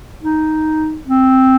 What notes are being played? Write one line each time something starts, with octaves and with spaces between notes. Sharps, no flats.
D#4
C4